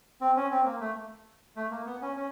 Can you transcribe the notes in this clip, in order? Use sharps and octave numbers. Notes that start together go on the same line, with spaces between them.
C4
C#4
C4
A#3
A3
A3
A#3
B3
C#4
C#4